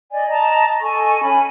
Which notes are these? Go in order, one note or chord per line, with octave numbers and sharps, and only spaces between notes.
D5 D#5 G#5
D#5 A5 A#5
A4 D#5 G#5 C#6
C#4 G#5 B5